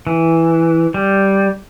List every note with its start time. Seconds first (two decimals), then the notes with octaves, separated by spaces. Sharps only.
0.07 E3
0.94 G3